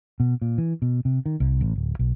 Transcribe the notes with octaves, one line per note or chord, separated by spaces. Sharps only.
B2
A#2
E3
B2
C3
D#3
C2
A1
D1
B1